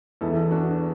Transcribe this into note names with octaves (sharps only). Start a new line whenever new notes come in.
E2 E3 E4 A4
D4 F#4